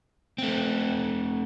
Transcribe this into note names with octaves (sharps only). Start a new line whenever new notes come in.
A3 C4